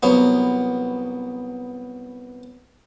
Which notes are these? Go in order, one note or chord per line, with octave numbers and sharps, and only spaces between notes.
C2 F#3 B3